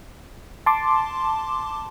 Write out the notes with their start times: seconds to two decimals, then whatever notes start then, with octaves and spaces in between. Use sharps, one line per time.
0.66 A5 C6 D6